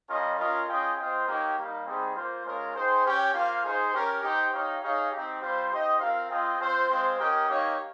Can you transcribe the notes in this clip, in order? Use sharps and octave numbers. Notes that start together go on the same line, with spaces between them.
G3 C#4 F4 A#4 D#5
C#4 F4 A#4 D#5
C#4 F4 G#4 D#5 G5
C4 F4 C5 D#5 G5
A#3 D#4 G4 C#5
G3 A#3 D#4
G3 C4 D#4 G#4
A#3 F4 C5
G#3 C#4 F4 A#4
D#4 G#4 C5 G5
C#4 G4 C#5 G5
A#3 F4 C5 F5
D#4 G#4 C5
C#4 G4 A#4
D#4 G4 C5 G5
D#4 G4 C#5 F5
D#4 G#4 C#5 F5
C4 D#4 G4
G3 C4 F4 C5
D#4 G4 C5 D#5
C4 F4 A#4 F5
C4 F4 G#4 D#5 G5
C4 F4 C5
G#3 C4 F4 C5
C#4 G4 A#4 D#5 G5
A#3 D#4 G4 C#5 F5